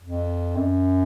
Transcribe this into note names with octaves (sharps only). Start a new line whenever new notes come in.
F2
F#2